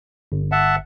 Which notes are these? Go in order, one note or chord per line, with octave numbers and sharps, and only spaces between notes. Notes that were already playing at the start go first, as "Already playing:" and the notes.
G1
E5 F#5 A5